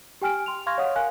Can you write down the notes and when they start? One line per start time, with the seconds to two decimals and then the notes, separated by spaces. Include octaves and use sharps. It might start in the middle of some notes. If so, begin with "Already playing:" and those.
0.22 G4 G5 G#5 F6 D7
0.46 C6 F7
0.67 F5 C6 C#6 F6 G#6 A#6
0.78 C#5 D#5 F5 F#5 D#6
0.96 A#4 F5 G#5 F#6